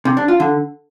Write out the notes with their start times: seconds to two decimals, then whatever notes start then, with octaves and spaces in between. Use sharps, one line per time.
0.05 C3
0.17 D4
0.28 F4
0.40 D3